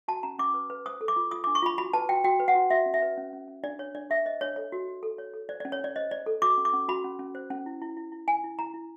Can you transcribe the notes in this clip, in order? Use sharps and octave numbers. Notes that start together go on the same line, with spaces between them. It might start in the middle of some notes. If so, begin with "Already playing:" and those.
F#4 A5
C#4 A#5
C#4 D6
B4
B4
C5 D#6
A4
D6
F4
F4 D#6
D4 D6
C#6
F4 B5
F#4 B5
B4 A5
F#4 G5
F#4 G5
B4
F#5
F#4
F#4 E5
C#4
E5
B4
C#4
C#4
C#4
D4 D5
D4 C#5
D4 D5
G4 E5
C5 D#5
D4 C#5
A4 C#5
F#4
F#4
A4
C#5
A4
C5 D5
C#4 D5
C#5
C#4 D5
C5 D#5
C5 D5
A4
F#4 D6
C#4
D6
C#4
F#4 B5
C#4
C#4
C5
C#4
E4
E4
E4
E4
E4 G#5
E4
E4 A#5
E4